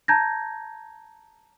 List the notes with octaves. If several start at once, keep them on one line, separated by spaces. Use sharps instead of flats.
A5 A#5 G6 G#6 A#6